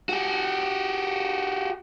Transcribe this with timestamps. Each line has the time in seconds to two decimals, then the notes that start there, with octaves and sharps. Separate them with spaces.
0.09 F#4 G4